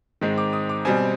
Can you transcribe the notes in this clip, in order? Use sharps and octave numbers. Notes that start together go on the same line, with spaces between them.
G#2 D#3 G#3 C4
D6
D#6
D6
B2 G3 C4 G#5